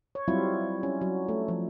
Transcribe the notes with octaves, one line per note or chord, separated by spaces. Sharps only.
C#5
F#3 G3 C4 E4 F4
C#4
F#3
A3
F3